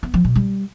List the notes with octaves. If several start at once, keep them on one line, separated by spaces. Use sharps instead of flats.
B3
F3
B2
G3